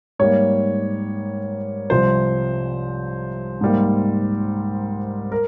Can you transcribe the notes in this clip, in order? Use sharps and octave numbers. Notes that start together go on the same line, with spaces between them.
G#2 G3 A#3 C#5
C2 C3 F3 C5
G#2 G3 A#3
A#4